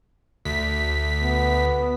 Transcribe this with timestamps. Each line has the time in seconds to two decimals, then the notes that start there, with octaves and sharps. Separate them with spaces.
0.45 D2 B6
1.22 B3